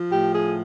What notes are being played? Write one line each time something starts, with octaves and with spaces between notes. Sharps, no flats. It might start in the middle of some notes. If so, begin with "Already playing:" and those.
Already playing: F3
A2 G4
G#4